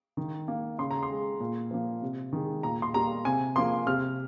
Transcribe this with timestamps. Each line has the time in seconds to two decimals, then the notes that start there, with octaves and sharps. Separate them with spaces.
0.17 D#3
0.48 A#3
0.78 C#3 C6
0.91 A#5
1.03 C6
1.10 G#3
1.40 A#2
1.71 F3 A#3
2.02 C3
2.33 D#3 G#3
2.63 A#2 A#5
2.82 C6
2.94 G3 A#3 A#5
3.25 C3 G#5
3.56 F3 A#3 C6
3.87 C3 F6